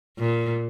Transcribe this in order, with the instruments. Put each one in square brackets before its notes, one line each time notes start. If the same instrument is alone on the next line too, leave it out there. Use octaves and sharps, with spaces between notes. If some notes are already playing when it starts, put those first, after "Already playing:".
[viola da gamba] A#2